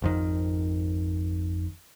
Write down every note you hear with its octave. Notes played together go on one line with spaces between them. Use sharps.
G#1 F2 D#3